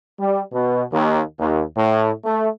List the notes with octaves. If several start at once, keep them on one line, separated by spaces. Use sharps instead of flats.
G3
B2
D#2
D#2
A2
A3